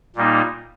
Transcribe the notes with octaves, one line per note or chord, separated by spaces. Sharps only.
A#2 G3 A#3 D#4